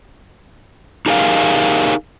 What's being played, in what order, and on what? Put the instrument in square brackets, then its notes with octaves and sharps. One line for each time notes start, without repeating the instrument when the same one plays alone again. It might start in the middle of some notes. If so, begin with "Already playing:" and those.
[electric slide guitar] D#4 G4 G#4 A#4 F5